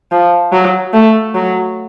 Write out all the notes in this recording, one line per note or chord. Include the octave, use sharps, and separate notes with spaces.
F3
F#3
A3
F#3